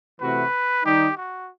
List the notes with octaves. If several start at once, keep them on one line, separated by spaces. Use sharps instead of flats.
C3 E3 A3 C4 F#4 B4
D#3 G3 D#4 G4
F#4